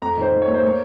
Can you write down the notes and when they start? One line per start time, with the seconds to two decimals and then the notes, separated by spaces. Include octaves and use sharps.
0.02 F2 A#5
0.17 D#3 C5
0.32 D#3
0.42 C#5
0.47 A#3
0.54 C5
0.63 A#3 C#5